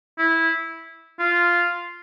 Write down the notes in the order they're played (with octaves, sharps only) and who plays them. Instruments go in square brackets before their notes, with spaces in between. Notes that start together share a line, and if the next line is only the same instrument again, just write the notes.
[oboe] E4
F4